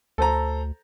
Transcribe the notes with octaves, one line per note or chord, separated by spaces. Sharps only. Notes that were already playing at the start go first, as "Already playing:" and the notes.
D2 A4 C5 A#5